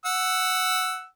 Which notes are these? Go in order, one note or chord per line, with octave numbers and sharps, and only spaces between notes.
F#5 E6